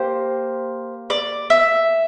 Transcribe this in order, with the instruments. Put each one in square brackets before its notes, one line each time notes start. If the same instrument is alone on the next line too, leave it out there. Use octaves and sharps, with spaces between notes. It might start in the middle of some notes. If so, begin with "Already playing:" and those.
Already playing: [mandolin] A#3 G4 C5
D5
E5